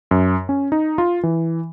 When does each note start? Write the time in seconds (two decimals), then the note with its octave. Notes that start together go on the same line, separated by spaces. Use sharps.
0.11 F#2
0.49 C#4
0.72 D#4
0.98 F4
1.23 E3